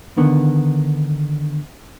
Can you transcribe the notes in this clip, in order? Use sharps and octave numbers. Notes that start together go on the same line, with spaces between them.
D3 D#3 B3